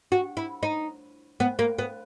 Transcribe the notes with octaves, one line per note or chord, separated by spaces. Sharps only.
F#4
E4
D#4
B3
A#3
B3